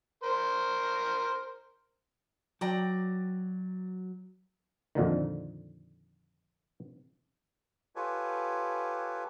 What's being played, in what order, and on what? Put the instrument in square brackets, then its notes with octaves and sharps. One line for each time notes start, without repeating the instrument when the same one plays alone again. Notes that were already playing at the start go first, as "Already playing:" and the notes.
[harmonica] A#4 C5
[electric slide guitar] F#3 [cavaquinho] D5 G5 A#5
[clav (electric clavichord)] F2 A#2 D3 D#3
[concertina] F4 G4 A4 B4 C#5 G#5